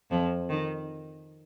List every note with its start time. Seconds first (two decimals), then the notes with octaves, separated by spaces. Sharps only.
0.11 F2 F3
0.49 D#3